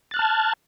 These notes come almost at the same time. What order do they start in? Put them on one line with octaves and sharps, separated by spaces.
A6 F#6 F6 A5 G#6